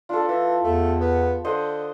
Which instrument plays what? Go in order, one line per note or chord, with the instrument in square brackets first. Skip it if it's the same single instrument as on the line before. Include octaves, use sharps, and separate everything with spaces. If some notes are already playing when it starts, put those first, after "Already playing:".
[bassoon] D4 [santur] F4 A4
[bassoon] E3
[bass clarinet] E2 [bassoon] A3
[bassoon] B3
[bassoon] D3 [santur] C5 D#5 F#5